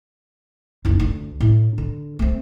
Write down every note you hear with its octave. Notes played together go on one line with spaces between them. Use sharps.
F#1 D#4
D2
A2
D3
A3 C4